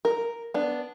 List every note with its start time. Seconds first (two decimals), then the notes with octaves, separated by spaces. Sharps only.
0.05 A#4
0.54 B3 D4